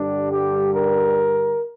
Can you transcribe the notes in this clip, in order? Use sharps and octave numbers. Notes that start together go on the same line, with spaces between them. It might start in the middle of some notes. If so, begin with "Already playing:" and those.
Already playing: G2 D3 G3 D4
G4
A#4